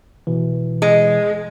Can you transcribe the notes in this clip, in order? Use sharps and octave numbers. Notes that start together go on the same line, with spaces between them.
B2 E3
G#3